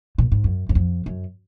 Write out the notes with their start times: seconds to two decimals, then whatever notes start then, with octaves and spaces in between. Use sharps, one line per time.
0.18 A#2
0.32 G#2
0.44 F#2
0.69 F#2
0.75 F2
1.06 F#2